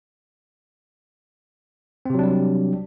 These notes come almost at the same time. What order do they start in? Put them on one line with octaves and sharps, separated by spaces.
C4 C3 F#3 D4 G3